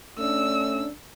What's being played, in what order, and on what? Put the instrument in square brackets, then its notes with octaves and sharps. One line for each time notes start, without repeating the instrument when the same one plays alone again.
[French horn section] A3 C#4 D4 [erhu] E6